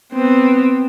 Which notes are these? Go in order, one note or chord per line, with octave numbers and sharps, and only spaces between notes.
B3 C4